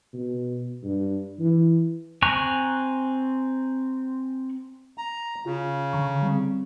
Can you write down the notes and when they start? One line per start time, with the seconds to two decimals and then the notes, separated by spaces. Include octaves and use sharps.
0.14 B2
0.84 G2
1.40 E3
2.22 C4 G#5 A#5 C#6 F#6
4.98 A#5
5.46 C#3 F4
5.93 D3 A#5 C#6
6.22 G3 C4